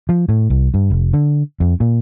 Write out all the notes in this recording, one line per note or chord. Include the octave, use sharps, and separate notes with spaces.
F3
A2
C2
G2
F1
D3
F2
A#2